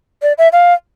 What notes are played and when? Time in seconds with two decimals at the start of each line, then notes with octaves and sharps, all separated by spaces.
0.22 D5
0.38 E5
0.53 F5